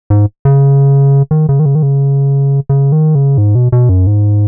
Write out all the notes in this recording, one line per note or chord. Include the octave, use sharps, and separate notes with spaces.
G#2
C#3
D#3
C#3
D#3
C#3
D#3
C#3
C#3
D#3
C#3
G#2
B2
B2
F#2
G#2